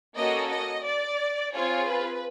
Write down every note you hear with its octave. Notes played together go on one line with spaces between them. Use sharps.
A#3 C#4 F#4 A4 D#5
D#5
D5
C4 F4 G#4 C#5
B4